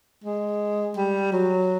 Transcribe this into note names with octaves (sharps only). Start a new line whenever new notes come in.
G#3
G3
F#3